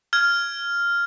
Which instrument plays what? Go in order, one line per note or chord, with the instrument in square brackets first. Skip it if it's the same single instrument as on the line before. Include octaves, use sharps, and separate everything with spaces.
[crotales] F6 G#6